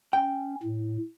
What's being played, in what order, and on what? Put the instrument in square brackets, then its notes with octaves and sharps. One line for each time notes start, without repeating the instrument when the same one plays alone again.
[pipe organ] C#4 [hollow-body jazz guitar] G5
[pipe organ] A2